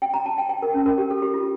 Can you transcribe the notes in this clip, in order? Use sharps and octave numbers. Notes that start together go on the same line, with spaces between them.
G5
A#5
A5
G5
G5
A#4
C#4
A#4
G4
A4
G4
F4